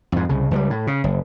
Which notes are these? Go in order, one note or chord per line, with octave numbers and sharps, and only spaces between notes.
F2 G#2
C2 C#3
C#2 F3 G3
A2
C#3
F#1